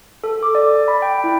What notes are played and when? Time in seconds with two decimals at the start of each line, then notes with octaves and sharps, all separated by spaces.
0.24 A4
0.43 D6
0.55 D5
0.88 B5
1.02 G5
1.24 E4